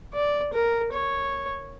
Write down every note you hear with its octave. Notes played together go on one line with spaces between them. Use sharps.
D5
A#4
C#5